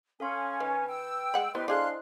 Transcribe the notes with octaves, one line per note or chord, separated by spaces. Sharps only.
C#4 A4 F5 G#5 C6
D#3 B4
G5 E6
G#3 F#5 B5
B3 E4 G4 B4 C5 D#5 C6
D4 G#4 A4 F5 C6 F#6